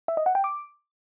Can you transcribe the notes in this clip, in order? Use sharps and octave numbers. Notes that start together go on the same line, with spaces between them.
E5
D#5
F#5
G5
D6